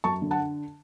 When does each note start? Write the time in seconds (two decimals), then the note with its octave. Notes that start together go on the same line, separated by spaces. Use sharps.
0.04 F#2 A5 C#6
0.22 D3
0.31 F#5 A5